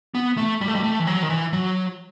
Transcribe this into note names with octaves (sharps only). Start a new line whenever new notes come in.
B3
A3
G3
A3
G3
A3
E3
F#3
D#3
E3
F#3